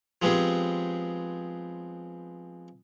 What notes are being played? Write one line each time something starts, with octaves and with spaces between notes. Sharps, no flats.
F3 G#3 B3 C4 G4 G#4